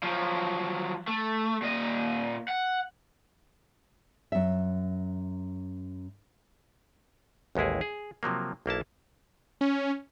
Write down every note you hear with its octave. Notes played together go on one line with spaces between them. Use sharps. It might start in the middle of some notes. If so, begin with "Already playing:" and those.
F3 F#3
A3
A#2 D#5
F#5
F#2 E5
A1 D#2 G#3 E4 G#4
G#4
C3 F3 F#3 A#3
B1 A#3 E4 A5
C#4